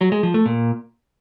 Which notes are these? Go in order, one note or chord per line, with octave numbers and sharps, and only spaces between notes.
F#3
G#3
F3
A3
A#2